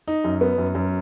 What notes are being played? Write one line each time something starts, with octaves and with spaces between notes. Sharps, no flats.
D#4
F#2
B3
F#2
F#2